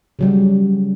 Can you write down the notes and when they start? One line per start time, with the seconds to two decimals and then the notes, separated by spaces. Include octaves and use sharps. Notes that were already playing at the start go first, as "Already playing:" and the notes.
0.19 C#3 F#3 G3